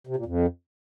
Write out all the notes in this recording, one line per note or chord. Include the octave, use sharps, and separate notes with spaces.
C3
A#2
F2